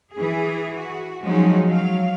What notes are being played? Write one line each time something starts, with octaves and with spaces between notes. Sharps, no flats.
E3 G#4
F#4
F3 F#3 G#3 C#4 D#4 F#4
F#3 F5